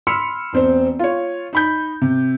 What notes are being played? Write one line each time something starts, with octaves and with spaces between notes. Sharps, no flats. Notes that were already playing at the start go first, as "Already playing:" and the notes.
B5 C6 E6 F6 C#7
E1 C4 C5
F4 C#5
D#4 B5 G6
C3